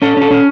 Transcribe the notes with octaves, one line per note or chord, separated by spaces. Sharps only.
C#4 A4
C#4 A4
C#4